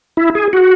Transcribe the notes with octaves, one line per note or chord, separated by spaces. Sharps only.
E4
G#4
F#4